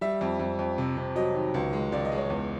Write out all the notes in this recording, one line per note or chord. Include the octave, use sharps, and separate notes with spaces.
G3 E5
F2
F2
F2
C3
C3
F#3 D#5
D#3
C#2
G#3
C#2 D5
D#5
G#3
C#5
E2